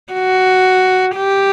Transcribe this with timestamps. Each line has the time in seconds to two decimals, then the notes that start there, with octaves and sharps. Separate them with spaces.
0.13 F#4
1.16 G4